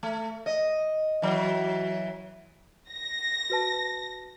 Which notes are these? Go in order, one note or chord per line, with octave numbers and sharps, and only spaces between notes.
A3
D#5
E3 F#3
A#6
F#4 B4 A5